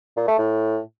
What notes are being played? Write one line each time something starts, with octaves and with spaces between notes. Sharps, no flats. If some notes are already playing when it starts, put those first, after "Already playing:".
A#2
A3
A2